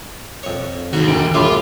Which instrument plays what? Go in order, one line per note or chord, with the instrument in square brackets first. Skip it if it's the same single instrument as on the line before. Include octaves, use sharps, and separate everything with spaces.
[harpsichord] F2 C#5
[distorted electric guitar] D#2 [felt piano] G#2 [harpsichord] F#4
[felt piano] E1 D2 D7
[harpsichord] F#2 A2 G#3 [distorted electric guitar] F4 [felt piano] B5 C6 D6